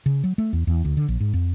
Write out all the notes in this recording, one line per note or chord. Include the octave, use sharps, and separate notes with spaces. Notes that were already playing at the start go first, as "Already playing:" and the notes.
C#3
F#3
A3
E2
E2
D2
D3
A#1
G#2
F2